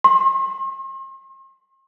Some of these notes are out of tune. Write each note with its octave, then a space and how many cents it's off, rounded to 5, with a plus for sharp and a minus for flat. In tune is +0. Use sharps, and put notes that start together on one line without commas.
C6 +45